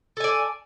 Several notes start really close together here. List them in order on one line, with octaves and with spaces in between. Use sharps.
A4 G#5 D5